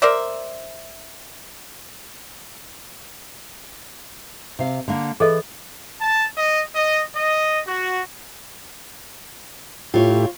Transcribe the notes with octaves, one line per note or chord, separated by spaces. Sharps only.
A#4 C5 D5 E5
C3 F5
D3 A#3
E3 G#4 A4 D#5
A5
D#5
D#5
D#5
F#4
A2 E4 F4 G4 C#5